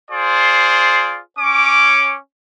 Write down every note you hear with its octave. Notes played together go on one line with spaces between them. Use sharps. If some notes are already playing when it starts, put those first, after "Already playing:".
F4 G#4 C5 D5
C#4 D6